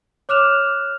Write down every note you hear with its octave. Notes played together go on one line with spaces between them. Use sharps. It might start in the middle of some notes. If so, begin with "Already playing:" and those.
C#5 D6 F6 F#6 E7 F7